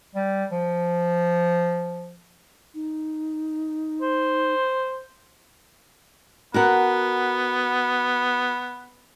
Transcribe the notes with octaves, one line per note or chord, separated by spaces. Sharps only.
G3
F3
D#4
C5
B3 F#4 A#4 F#5